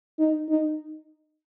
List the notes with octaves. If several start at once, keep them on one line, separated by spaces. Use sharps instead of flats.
D#4
D#4